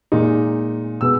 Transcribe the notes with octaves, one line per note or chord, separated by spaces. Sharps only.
A#2 G#3 D#4
B2 G#3 B3 E6